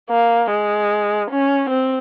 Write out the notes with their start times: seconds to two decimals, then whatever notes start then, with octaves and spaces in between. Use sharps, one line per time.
0.10 A#3
0.50 G#3
1.30 C#4
1.70 C4